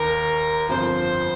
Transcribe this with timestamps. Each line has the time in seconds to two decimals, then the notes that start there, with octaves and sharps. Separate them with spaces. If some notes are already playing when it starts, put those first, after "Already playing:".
Already playing: D#2 D#3 A#4
0.69 G1 F2 F3 C4 C5